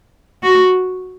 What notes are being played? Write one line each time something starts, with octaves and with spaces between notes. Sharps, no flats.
F#4